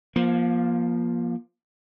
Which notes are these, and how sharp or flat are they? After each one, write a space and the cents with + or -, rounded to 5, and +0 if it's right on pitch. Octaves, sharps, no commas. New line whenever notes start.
F3 +0 A#3 +30